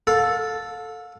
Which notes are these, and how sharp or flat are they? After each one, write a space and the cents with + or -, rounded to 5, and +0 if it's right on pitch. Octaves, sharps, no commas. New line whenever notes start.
A4 +0 F5 +35